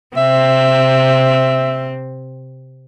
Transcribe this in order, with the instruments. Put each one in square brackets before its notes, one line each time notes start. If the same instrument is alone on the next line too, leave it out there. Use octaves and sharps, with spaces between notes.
[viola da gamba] C3 C4 [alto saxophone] E5